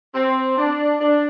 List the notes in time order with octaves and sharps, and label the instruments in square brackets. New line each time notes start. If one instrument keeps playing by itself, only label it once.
[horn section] C4
D4
D4